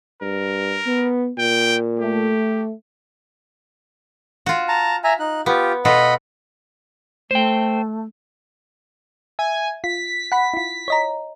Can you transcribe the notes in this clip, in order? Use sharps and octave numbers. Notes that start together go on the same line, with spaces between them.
G2 A#4
B3
A#2 G5
A3 G4
F4 F#4
A5 A#5
E5 G#5 A#5
D#4 F#6
B3 F4 G4
B2 F4 A4 D#5 F#5 B5
A3 C5 G5
E5 G#5
F4 B6
F#5 B5
E4 F4
C#5 D#5 A#5